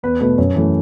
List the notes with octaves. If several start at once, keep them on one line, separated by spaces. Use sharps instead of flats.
E2 B4
B2 A3 B4
F#2 C#5
E3 A3